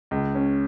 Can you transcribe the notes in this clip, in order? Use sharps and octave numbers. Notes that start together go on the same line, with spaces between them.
C#2
C#4